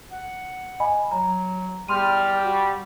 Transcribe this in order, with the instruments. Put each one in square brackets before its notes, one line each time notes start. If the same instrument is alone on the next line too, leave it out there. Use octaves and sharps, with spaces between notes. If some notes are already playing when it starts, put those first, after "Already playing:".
[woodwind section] F#5
[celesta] D#5 G#5 B5
[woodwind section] F#3 [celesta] A#5
[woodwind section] E2 F6 [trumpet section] G3 [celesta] C6 D#7
[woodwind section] F#4